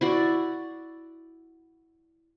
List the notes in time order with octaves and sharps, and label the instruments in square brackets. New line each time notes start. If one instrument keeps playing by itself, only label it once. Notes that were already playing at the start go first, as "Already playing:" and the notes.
[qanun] E4 F#4 D5